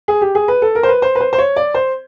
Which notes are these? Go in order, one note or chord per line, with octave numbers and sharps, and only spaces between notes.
G#4
G4
G#4
B4
A4
A#4
C5
B4
C5
B4
C5
C5
C#5
D5
C5